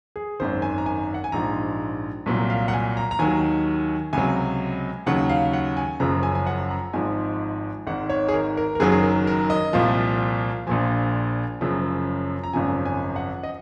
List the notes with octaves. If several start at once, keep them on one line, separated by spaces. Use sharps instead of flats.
G#4
G#1 F#2 D#3 C5
G#5
A#5
G#5
F#5
G#5
A#1 G#2 F3 A#5
C2 A#2 F#3
F5
F#5
G#5
A#5
A#5
D#2 D#3 F#3 G#5
C#2 C3 F#3 G#5
D#2 C#3 F#3 F#5
F5
F#5
G#5
F#1 F#2 C#3 F3 A#5
G#5
G#5
F#5
A#5
G#1 G#2 F3 G#5
G#1 G#2 D#3 F#5
C#5
G#4
A#4
A#4
A#4
F#1 F#2 D#3 F#3 G#4
G#4
A#4
A#4
D#5
C2 A#2 F3 F5
A#1 A#2 F3 G#5
F#1 F#2 C#3 F3
A#5
G#1 F#2 C#3 F3 G#5
G#5
F#5
D#5